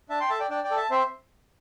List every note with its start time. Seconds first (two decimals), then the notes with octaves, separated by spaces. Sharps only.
0.09 D4 E5 A5
0.20 G5 C6
0.29 A4 E5 A5
0.40 D5 G5
0.50 D4 D5 G5
0.64 D5 G5
0.71 A4
0.77 E5 A5
0.90 C4 C5 E5